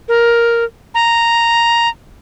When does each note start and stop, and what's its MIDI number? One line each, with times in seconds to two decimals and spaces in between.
0.08 0.64 70
0.95 1.89 82